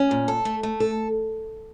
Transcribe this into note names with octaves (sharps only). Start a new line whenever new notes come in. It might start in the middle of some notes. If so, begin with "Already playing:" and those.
Already playing: C#4
A#2
A4
A3
A3
A4